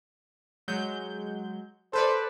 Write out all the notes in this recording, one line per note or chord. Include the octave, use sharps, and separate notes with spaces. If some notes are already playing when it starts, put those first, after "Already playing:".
F#3 G#3 G6
A4 B4 C5 D5